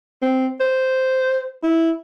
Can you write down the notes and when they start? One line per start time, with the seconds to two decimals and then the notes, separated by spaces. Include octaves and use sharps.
0.22 C4
0.60 C5
1.63 E4